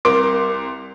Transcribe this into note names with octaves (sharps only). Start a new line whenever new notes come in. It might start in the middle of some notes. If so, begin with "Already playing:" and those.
C2 A#4 C6 D6 D7